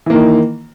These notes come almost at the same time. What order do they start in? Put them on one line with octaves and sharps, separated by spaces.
E3 A#3 D#3